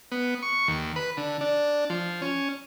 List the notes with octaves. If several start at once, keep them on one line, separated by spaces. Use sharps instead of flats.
B3
C#6
D#2
B4
D3
D4
F3
C#4